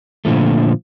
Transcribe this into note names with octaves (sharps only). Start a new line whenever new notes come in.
A#2 D3 F3 A3